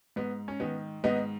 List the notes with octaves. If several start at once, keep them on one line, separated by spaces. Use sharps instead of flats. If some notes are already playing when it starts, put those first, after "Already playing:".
G#2 B3
C#4
D#3 B3
G#2 B3 D#4